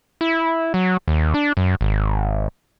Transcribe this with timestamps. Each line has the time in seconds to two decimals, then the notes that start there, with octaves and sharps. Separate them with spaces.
0.21 E4
0.74 F#3
1.08 D#2
1.34 D4
1.57 F#2
1.81 G#1